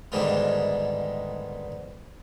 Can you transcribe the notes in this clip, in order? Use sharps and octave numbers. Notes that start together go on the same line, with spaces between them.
G#2 B2 D3 D#3 G3 G#3